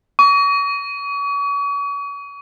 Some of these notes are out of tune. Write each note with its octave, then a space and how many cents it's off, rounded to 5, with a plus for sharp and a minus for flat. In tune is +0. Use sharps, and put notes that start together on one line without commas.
C#6 +40